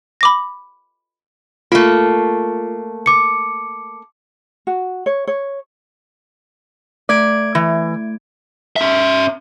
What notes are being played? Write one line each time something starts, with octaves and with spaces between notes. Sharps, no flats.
B5 D6 A#6
A3 A#3 F4
D6 C#7
F#4
C#5
C#5
A3 D5 G#6 D7
E3
C#4 E5